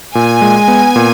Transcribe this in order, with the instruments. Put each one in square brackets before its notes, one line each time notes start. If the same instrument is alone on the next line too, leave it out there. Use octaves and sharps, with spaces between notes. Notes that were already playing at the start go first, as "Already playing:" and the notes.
[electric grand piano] A#2 [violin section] G#5
[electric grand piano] G#3
B3
A#2